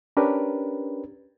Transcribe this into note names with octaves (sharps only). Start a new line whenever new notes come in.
C#4 D4 G4 A#4 B4